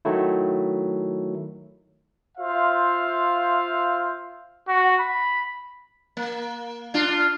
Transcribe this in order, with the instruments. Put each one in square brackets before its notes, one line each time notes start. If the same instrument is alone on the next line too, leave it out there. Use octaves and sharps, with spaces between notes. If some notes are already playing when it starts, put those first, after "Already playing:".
[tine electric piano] D#3 F#3 A3 E4
[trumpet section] F4 C5 E5 F5
[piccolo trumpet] F#4
B5
[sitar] A#3
D4 F4